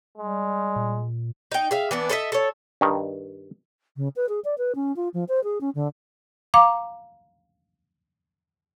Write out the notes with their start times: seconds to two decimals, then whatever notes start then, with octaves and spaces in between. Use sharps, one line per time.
0.18 G3 G#3
0.76 A#2
1.52 D#4 G5
1.71 G#4 E5 F5
1.91 E3 B3 D4
2.09 A4 C5 D#5 E5
2.32 A4 C#5
2.81 G2 D#3
3.97 C#3
4.16 B4
4.29 G#4
4.44 D5
4.58 B4
4.75 C#4
4.96 F4
5.14 F3
5.28 C5
5.44 G#4
5.61 C#4
5.75 D3
6.54 F5 A#5 D6